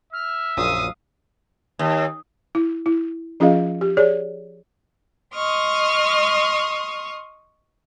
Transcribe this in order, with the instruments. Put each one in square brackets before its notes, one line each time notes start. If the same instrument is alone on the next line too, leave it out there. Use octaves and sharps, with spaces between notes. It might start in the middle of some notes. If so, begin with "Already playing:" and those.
[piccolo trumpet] E5 [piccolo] F6
[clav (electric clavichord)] A#1 F#2 A#2 [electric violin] F5 D#6 [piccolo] D#7
[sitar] D#2
[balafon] E4
E4
F3 C#4 F4 G#4 D#5 F5
G4
G#4 C#5 D5
[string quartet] D#5 C6 C#6 D#6 F6